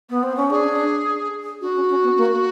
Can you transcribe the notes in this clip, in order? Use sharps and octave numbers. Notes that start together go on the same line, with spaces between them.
B3
C4
C#4
D4 G#4
D4 F#4
C#4
C#4
B3
A#3